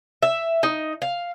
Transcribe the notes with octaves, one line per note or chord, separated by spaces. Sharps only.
E5
D#4
F5